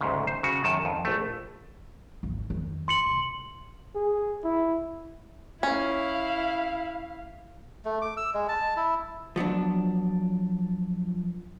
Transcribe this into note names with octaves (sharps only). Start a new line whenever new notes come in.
D2 G#2 C#3
C5
C#3 F#4
F#2 D#3 A5
F2
A#1 A3
G#1 D2
F2 D#3
E2 C6 C#7 F#7
C2 C3
G#4
E4
C#4 E4 F5
A3
D6
E6
G#3
A5
E4
F3 F#3 B3 D4